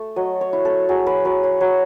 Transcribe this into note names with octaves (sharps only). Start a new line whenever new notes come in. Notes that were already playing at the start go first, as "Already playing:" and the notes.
Already playing: A3 A4
F#3 D#5
C#5
E4
A4
F#3 G#4
B4
F#3 B4
C#5
F#3